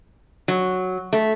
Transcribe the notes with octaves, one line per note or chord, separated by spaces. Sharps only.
F#3
A3